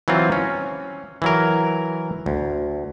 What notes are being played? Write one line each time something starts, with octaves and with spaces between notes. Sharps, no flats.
E3 F#3 C4 F4
C#4
E3 F#3 A#4
D2